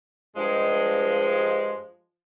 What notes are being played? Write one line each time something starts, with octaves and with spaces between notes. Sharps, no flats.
G2 F3 G#3